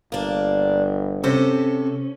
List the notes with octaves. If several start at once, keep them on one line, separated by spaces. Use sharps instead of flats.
G1 A#3 D4
C3 C#4 A4 C5